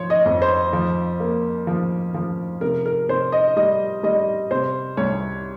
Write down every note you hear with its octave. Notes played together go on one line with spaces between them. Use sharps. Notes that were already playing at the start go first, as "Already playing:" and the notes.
Already playing: F3 C5 C#5
D#5
F2
C5
F3
A#3
F3
F3
C3 A#4
A#4
C3 C5
D#5
G3 D#5
G3 D#5
C3 C5
C2 C#5